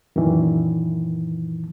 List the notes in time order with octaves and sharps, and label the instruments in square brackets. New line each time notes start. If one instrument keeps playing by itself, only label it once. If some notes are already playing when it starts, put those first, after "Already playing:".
[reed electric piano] F#2 A#2 D#3 E3